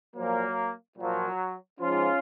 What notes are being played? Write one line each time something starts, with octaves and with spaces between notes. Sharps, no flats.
A#2 F3 F#3 A#3
A#2 F3 F#3
G#2 F3 C#4 F4